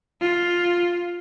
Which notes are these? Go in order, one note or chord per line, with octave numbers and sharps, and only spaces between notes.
F4